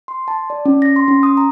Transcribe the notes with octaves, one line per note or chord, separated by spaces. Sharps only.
C6
A5
D5
C#4
A#6
C6
C#4
D#6
A#5